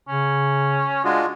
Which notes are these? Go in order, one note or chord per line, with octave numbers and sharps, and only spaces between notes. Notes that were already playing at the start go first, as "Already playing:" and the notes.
C#3 C#4
G#3 D4 F4 F#4